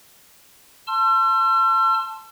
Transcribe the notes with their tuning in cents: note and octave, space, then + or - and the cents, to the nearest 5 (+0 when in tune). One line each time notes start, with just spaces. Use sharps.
A5 +0 C6 +20 E6 +45